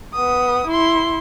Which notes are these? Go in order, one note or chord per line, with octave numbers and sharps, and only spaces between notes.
B3 D#6
E4 C6